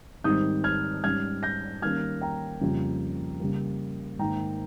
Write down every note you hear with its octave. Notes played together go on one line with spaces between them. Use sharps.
G#2 D#3 G3 C4 D#4 D#6 G6
F6 G#6
G#2 G3 C#4 F6 G#6
G6 A#6
D#3 G3 A#3 C#4 F6 G#6
G5 A#5
F2 C#3 G3 A#3 F4
C#3 G3 A#3
G#2 D#3 A#3 G5 A#5